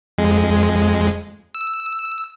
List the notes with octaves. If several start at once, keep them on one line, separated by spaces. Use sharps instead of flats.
F2 G#3
E6